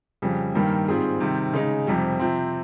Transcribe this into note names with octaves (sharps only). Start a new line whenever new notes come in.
F2 C#3 G3
G2 D#3 G3 A#3
G#2 G3 C4 F4 G#4
C3 D#3 G3 C4
C#3 G#3 D#4
F2 C3 G3
C3 F3 C4